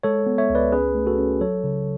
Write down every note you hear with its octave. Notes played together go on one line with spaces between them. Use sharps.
G#3 A4 C#5
B3
C#5 E5
C#2
B4 D5
C#4 G#4 B4
A3
F#4 A4
C#4
F#3 A4 C#5
C#3